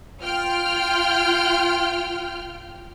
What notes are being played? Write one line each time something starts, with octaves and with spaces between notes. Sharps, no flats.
F4 G5 F6